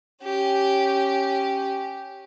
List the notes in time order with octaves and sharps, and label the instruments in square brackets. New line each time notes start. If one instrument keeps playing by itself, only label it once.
[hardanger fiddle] C#4 G4